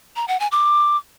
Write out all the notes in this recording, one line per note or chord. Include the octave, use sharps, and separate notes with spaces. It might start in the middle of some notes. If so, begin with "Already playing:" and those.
A#5
F#5
G#5
D6